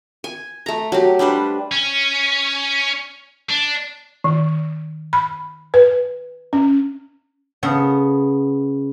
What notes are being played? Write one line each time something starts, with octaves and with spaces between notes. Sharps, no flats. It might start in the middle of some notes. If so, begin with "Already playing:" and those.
G#5
A3 A#5
F#3 G4
G3 D4 B4 C5
C#4
D4
D#3
B5
B4
C#4
C#3 B3 A4